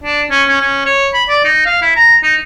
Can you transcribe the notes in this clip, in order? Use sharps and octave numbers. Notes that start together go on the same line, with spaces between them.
D4
C#4
C#4
C#4
C#5
B5
D5
D#4
F5
E4
A#5
D#4